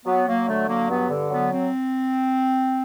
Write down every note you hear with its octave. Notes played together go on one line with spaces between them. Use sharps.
F#3 B3
F#3 A#3
D3 A3
F#3 A#3
G2 B3
D3
F#3 B3
C4